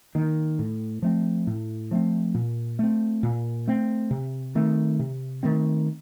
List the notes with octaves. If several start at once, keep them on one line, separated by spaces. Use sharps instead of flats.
D#3 A#3
A2
F3 A3 C4
A2
F3 A3 C4
A#2
A3 C4
A#2
A3 C4
C3
D#3 A3 C4
C3
D#3 A3 C4